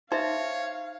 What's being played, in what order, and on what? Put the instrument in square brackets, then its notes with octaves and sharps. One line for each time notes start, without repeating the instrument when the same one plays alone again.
[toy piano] D#4 E5 [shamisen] C5 [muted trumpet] C#5 [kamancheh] F5